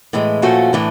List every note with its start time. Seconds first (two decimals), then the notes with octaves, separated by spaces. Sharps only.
0.13 A2 E3 G#3
0.42 A#2 F3 A3 C#4 F#4
0.73 A2 E3 A3 D4